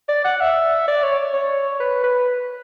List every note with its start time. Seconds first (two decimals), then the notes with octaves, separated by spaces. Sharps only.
0.09 D5
0.24 F#5
0.41 E5
0.87 D5
1.03 C#5
1.33 C#5
1.80 B4
2.03 B4